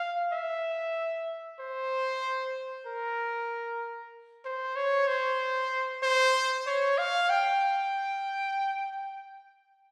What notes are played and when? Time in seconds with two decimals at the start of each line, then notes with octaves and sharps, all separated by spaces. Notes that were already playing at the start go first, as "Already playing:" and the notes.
Already playing: F5
0.32 E5
1.59 C5
2.86 A#4
4.45 C5
4.76 C#5
5.08 C5
6.03 C5
6.67 C#5
6.98 F5
7.30 G5